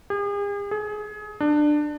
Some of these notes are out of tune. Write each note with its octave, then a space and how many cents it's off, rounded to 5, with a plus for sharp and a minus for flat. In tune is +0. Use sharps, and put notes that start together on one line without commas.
G#4 -45
G#4 +25
D4 +20